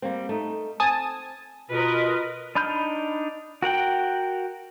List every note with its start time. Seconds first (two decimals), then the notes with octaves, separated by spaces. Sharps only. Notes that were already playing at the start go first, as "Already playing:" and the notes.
0.02 G3 A#3 C4
0.29 A3 D#4
0.80 C4 G#5 A5 D#6
1.71 B2 F4 A#4 B4 D#5
2.55 D4 D#4 B5 F6 G6
3.62 F#4 A#4 F#5 G5